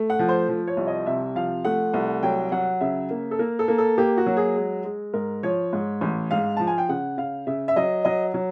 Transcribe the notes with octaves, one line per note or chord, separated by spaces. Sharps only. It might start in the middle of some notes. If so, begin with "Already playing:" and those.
Already playing: A3
F#5
F3
C5
F3
C#5
C2
D#5
C3 E5
F3 F5
A3 F#5
C2
F#3 G5
F#3 F#5
C#3 E5
A#3
A4
A#3 A#4
A4
A#3
A4
A#3 G4
F#4
F#3
G#4
G#3
G#3
G#2 A#4
F3 C#5
G#2
A1
G#2 F5
F3 A5
G#5
G5
C#3 F#5
C#3 F5
C#3 E5
E5
F#3 D#5
F#3 D#5
F#3